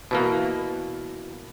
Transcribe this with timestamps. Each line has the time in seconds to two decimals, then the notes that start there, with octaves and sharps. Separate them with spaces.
0.11 B2 E3 A#3